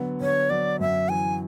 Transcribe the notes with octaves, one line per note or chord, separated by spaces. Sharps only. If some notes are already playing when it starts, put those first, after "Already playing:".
Already playing: D3 F#3 B3 D4
D3 C#5
F#3 D5
F#2 E5
E3 G#5